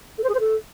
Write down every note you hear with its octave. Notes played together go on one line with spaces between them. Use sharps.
A4
C5
G#4
C5
A4